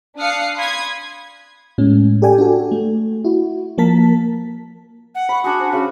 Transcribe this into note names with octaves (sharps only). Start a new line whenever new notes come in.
D4 F5 D#6 F#6 C7 C#7
B5 C6 D#6 G#6
A2 G#3 C#4
G4 A4 D5 G5 G#5
D4 F#4 A4
A3
E4 F#4
F3 A#3 A#4 A5 B6
F#5
B5 C#6
D4 F#4 G#4
C5
C#3 F#4